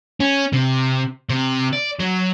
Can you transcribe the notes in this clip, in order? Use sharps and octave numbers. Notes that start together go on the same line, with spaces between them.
C#4
C3
C3
D5
F#3